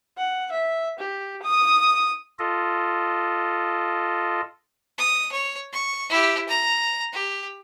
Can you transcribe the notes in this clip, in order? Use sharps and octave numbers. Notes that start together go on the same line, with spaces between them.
F#5
E5
G4
D#6
F4 A4 D#5
D#6
C#5
C#6
E4 G4
A#5
G4